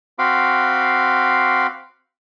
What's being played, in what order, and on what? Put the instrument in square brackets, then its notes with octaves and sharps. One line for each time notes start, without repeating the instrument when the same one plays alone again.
[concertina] C4 F#4 F5 B5 C6 D6